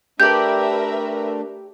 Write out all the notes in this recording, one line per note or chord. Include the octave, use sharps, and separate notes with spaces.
A3 D4 G4 A#4 B4 D5 E5 G6